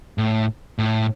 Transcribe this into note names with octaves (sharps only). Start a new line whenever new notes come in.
A2
A2